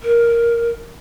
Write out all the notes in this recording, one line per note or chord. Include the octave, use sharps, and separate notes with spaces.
A#4